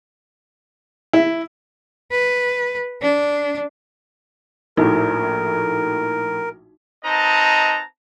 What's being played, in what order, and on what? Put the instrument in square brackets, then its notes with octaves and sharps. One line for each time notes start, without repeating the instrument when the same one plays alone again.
[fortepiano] E4
[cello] B4
D4
[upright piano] A#1 A2 [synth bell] D#4 F#4 [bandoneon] A#4
[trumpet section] C4 D#4 B4 D#5 A5 A#5